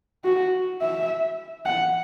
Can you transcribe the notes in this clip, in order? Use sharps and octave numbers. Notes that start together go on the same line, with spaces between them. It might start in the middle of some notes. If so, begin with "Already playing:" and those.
F#4
E5
F#5